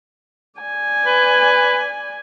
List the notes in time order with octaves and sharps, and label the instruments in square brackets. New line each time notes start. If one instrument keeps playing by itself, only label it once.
[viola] D5 G#5
[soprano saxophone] B4